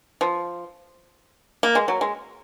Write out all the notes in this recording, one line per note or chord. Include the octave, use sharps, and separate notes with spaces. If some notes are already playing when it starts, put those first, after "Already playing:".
F3
A#3
G#3
F#3
G#3